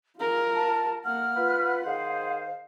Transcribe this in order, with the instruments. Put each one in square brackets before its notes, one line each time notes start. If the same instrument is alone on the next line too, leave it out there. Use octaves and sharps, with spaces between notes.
[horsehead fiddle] F4 A#4 [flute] G#4
[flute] A5
[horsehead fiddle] A#3 F#5 [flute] F6
[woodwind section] F4 B4 [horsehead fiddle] F#5
[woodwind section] D#3 G#4 C5 [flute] F5